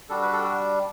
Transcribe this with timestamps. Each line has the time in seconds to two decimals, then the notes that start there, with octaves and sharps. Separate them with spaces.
0.09 G3 D4 F#4 A4
0.22 B4
0.33 A4
0.44 F#4